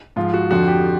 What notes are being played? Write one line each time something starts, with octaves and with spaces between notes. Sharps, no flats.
G#2 F3 F4
F#4
F2 D3 F3 F#4
G4